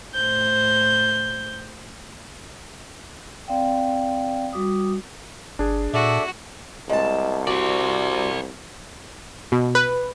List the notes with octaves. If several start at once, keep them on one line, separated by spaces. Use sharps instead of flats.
A2 C5 G6
C4 D5 F5 G5
G3 F#4 D6 D#6
G1 D4 G#4
A#2 F#4 A4 D5 E5
C2 G#3 A5
F#4 C5 D5
B2
B4